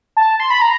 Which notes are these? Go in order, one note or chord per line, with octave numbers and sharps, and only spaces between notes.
A5
C6
B5
A#5